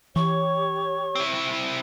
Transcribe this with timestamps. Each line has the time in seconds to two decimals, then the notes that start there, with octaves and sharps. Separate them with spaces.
0.16 E3 G4 C#5 C#6
1.15 C4 E4